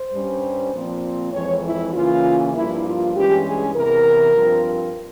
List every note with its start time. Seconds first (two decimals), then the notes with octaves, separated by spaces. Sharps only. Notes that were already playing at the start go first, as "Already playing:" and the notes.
Already playing: C5
0.11 G2 G3 C#4
0.72 A#2 F3 C4
1.32 F2 E3 G#3 C#5
1.63 E4
1.93 C#3 E3 A#3 C#4 F4
2.53 G2 F3 A#3 E4
2.84 F4
3.15 G2 E3 G#3 C#4 G4
3.45 G#4
3.75 E2 C3 E3 A#4
4.35 G2 F3 C4